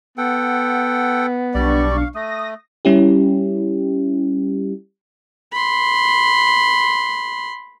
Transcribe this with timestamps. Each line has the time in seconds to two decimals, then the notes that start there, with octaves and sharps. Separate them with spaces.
0.18 B3 A4 F#5 G5
1.54 B1 G3 D4 D5 C#6
1.97 F5
2.15 A3 D#6 A#6
2.85 G3 C#4 E4 G4
5.52 B5 C6